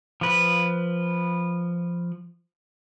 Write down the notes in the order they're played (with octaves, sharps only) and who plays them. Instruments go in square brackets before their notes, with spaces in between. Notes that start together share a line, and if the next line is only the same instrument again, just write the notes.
[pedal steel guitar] F3 B4